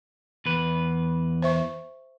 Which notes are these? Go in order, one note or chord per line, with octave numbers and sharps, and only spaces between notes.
E2 B4
C5 E5 C#6